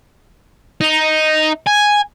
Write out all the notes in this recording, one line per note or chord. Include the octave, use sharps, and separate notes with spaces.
D#4
G#5